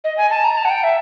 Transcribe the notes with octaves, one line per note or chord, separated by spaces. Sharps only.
D#5
G#5
A5
A#5
A5
F#5
G5
E5